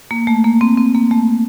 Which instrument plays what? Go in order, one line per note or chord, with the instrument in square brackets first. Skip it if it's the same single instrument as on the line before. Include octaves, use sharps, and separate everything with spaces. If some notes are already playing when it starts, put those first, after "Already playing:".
[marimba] A#3
A3
A#3
C4
C4
A#3
A3